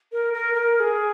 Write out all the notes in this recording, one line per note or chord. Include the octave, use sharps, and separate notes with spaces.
A#4
A#4
A#4
A#4
G#4